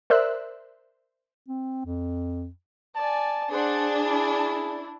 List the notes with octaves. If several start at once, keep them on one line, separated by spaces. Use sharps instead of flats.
A#4 C5 D5 E5 E6 F#6
C4
F2
D5 G#5 A5
D4 G#4 C5 F#5
E4